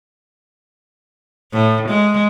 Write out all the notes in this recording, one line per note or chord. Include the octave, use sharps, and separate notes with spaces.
A2
G#3